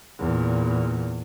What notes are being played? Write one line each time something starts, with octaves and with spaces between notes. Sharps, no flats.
E2 A#2